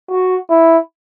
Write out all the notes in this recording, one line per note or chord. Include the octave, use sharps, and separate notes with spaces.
F#4
E4